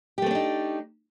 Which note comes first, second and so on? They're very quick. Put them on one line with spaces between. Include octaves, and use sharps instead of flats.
G4 A3 C4 D4 D#4